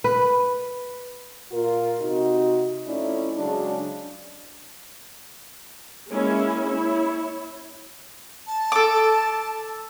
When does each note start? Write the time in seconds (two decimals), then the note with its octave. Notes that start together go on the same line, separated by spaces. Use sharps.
0.04 B4
1.51 A#2 F4 A#4
1.99 C3 D#4 F#4
2.86 F2 A3 C#4 D#4 E4 D5
3.37 C#3 F#3 G#3 D4
6.10 G#3 A#3 C#4 E4
6.66 E4 C#5
8.47 A5
8.72 A4 D6